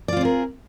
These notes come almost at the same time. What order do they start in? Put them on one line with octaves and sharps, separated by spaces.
D5 F4 C4 G#4 A#4